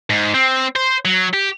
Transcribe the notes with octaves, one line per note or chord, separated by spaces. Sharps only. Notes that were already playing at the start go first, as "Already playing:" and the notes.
G#2
C4
C5
F#3
G4